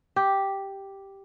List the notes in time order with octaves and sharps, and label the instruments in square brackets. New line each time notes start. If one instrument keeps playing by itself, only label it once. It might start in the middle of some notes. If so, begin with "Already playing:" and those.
[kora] G4